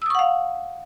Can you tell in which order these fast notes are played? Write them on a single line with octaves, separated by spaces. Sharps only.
E6 D#6 C#6 F#5 F5